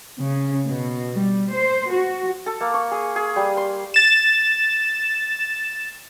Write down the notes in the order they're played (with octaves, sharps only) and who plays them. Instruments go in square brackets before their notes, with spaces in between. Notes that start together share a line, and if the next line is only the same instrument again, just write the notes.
[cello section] C#3
B2
G3
C5
F#4
[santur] A4
A#3
C#6
G#4
G#4
G3
C6
[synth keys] A6 E7